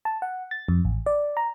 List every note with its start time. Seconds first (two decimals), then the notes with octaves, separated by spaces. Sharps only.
0.05 A5
0.22 F#5
0.51 A6
0.68 F2
0.85 A1
1.06 D5
1.37 A#5